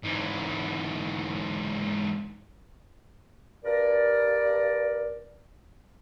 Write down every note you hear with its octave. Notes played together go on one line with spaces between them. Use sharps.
G#2 E3
G2 A#4 D5